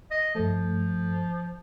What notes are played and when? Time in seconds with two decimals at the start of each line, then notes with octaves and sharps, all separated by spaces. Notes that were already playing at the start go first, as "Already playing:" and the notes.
0.11 D#5
0.35 G2 F3 A3